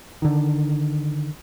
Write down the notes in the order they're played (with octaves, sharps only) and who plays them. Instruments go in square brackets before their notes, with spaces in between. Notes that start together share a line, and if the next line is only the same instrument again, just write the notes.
[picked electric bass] D3 D#3